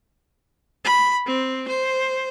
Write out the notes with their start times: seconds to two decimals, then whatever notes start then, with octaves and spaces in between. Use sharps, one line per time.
0.85 B5
1.26 C4
1.68 C5